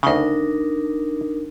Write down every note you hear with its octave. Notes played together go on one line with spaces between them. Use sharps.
D2 C#3 D4 D#4 A#4